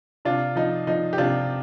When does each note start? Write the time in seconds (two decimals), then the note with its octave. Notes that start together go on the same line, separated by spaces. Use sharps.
0.25 C3 D4 F4
0.56 F3 D#4
0.87 F3 D#4
1.13 G4
1.18 C3 D4 F4